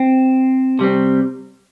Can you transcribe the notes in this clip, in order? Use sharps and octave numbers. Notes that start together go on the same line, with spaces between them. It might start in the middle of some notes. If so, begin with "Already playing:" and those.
Already playing: C4
C3 G3 C4